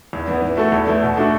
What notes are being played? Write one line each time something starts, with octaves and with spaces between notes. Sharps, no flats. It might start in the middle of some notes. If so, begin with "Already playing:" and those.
E2
E3 B3
E3
A3 F#4 A4
E2
E3 A3 E4
B2
A3 D4 F#4 A4